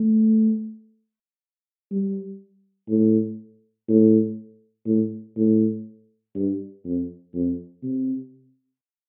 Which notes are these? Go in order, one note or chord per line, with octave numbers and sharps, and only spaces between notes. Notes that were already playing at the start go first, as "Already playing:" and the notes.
Already playing: A3
G3
A2
A2
A2
A2
G2
F2
F2
C3